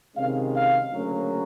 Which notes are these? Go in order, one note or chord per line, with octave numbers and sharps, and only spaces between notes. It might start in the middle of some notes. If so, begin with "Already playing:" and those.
C3 D#3 G#3 C#4 F5
F5
D2 C#3 F#3 A#3 C#4